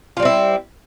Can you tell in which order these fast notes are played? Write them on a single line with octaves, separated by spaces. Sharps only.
F4 G3 C4 E4